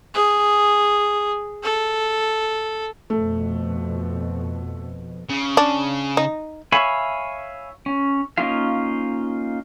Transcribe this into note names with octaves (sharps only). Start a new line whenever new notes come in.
G#4
A4
F2 B2 A3
C#3
D4
D#4
C#5 E5 F5 G#5 B5
C#4
A#3 C#4 D#4 F4 F5